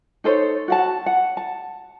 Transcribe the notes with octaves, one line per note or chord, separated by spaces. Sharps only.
D#4 A4 C5 C#5
F#4 F#5 A5
F#5
A5